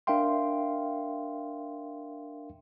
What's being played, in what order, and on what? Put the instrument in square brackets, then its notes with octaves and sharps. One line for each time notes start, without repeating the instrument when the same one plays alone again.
[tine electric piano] D4 A#4 E5 F5 G5 C6